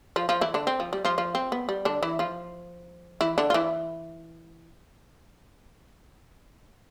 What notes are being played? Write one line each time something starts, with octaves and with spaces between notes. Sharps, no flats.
F3 F4
F3 F4
E3 E4
D3 D4
C4
F3
G3
F3 F4
F3 F4
C4
B3
G3
D3 D4
E3 E4
F3 F4
E3 E4
D3 D4
F4
E3 E4